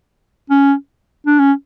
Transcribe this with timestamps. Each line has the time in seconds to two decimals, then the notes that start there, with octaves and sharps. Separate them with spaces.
0.50 C#4
1.26 D4
1.39 C#4